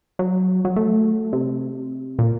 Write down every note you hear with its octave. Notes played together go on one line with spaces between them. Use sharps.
F#3
F#3
A3
C3
A#2